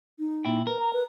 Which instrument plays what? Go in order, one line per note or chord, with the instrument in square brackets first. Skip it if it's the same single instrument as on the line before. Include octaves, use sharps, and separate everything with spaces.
[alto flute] D#4
[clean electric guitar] A#2 E4 G5
[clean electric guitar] A#4 [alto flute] B4
[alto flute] A#5
B4